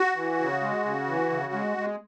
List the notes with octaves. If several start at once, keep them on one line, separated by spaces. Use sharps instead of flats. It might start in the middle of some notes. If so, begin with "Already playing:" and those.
Already playing: F#4
E3
C#3
G#3
C#3
E3
C#3
G#3
G#3